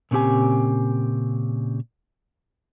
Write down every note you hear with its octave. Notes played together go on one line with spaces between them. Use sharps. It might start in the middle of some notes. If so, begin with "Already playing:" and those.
A#2 C#3 C4 G4 G#5